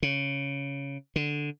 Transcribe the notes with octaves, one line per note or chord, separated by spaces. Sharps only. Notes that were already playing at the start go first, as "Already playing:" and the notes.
C#3
D3